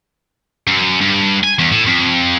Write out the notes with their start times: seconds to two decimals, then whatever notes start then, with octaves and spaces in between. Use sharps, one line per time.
0.67 F#2
1.01 G2
1.44 G#5
1.59 E2
1.72 A2
1.87 F2